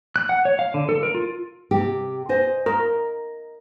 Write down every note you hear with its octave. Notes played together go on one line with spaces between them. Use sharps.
F#6
F#5
C#5
F5
D3
A4
A#4
F4
C3 G4
C5 D#5 G#5
A#4 D#5